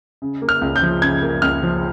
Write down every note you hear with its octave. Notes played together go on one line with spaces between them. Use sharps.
C#3
A#3
F6
C#2
G6
F3
C#3 G#6
A#3
C#2 F6
F3